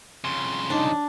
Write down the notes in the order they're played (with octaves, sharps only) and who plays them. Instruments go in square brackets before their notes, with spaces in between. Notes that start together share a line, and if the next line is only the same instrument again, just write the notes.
[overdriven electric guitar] C2 C6 [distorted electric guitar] F2 C#3
[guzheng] D4 [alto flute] D#4